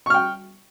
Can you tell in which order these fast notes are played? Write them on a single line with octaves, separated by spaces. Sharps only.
C#6 F6 G5